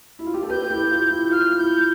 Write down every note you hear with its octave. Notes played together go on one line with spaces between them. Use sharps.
E4
F4
G4
A4
G4 B4 G6
E4 G4
F4
E4
F4 F6
E4 G6